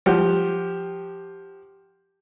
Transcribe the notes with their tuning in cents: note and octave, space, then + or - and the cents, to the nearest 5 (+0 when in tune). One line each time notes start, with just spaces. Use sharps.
F3 +0 G4 +0 F#5 +0